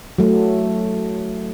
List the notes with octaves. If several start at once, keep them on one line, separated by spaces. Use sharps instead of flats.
F#3 A3